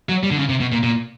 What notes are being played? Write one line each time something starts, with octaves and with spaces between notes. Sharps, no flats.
F#3
G3
D3
C#3
C3
B2
A#2
A#2